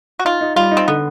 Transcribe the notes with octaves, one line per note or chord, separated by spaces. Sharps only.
F#4
D#4 F4
D#4
G3 F4
D#4
C4
D3 B3